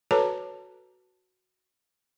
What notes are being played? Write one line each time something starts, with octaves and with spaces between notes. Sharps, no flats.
F#4 A4 B4 C#5 A5 A#5